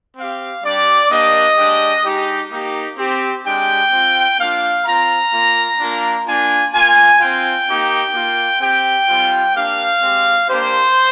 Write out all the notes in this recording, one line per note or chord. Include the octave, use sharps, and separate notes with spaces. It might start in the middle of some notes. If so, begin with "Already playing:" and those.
C4 G4 F5
G3 D4 G4 D5
A#3 D4 G4 D#5
G#3 D4 G4
G#3 D#4 G4
A#3 D#4 G4
C4 G4
G#3 D4 G4 G5
C4 F4
A#3 D4 F4 F5
C4 F4 A#5
A#3 F4
A#3 D4 F4
A#3 D4 F4 G#5
A#3 F4 G#5
C4 F4 G5
A#3 D#4 G4
A#3 F4
C4 G4 G5
G3 C4 F4
A#3 D4 G4 F5
G#3 C4 G4
A#3 D4 G4 C5